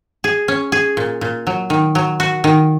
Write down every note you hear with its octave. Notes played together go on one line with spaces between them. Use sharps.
G#4
C#4
G#4
A#2
A#2
F#3
D#3
F#3
F#4
D#3